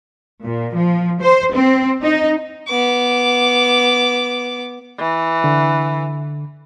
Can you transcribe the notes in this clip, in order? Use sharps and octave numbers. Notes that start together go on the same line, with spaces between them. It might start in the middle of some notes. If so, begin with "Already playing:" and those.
A#2
F3
C5
C4
D#4
B3 D6
E3
D3